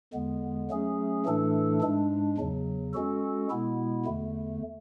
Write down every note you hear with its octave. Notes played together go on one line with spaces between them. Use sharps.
E2 D3 G#3 B3
F#3 A3 C#4 G#4
A2 E3 A3 D4 A4
G#2 G#3 D4
E2 C#3 F#3
G#3 C#4 F#4 A4
B2 G#3 B3 E4
E2 D3 A3